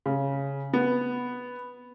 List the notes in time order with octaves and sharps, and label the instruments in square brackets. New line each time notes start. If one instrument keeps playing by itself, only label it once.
[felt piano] C#3
B3